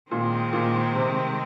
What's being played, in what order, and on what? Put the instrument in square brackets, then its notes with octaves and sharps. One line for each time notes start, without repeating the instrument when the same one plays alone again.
[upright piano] A#2 [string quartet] D#3 G#3 C4
[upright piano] A#2
C3